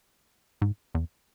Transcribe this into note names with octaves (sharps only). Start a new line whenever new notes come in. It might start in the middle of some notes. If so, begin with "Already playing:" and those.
G#2
E2